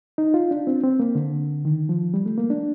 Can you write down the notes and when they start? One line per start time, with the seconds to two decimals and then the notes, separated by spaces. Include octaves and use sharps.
0.18 D#4
0.34 F4
0.51 D4
0.67 C4
0.83 C4
1.00 A#3
1.15 D3
1.65 D#3
1.89 F3
2.14 G3
2.26 A3
2.38 A#3
2.50 D4